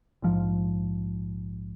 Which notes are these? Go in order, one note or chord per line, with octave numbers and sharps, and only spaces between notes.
A#1 G#2 F3